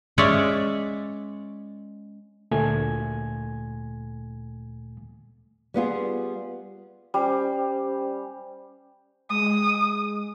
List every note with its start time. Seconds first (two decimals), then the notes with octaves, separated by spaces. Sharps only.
0.18 G#3 C#4 C#5 D5 E5
2.51 D2 A#2 A3 G#5 G#6
5.74 G3 B3 F4 G#4
7.14 G3 C#4 C5 G#5
9.30 G#3 D#6